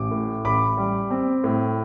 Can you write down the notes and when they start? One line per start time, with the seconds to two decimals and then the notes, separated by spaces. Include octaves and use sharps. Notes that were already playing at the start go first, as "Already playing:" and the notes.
Already playing: A1 D6
0.11 A2
0.45 A1 B5 D6
0.77 G3
1.11 C4
1.44 A2